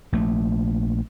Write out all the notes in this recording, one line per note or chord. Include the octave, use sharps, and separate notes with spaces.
A#1 A3